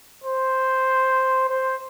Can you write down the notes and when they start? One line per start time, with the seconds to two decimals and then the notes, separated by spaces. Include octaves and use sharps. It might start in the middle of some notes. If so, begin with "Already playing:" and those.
0.24 C5
1.49 C5